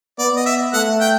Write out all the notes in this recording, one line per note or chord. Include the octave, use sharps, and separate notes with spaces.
B3 D5
D#5
E5
A3 F#5
G5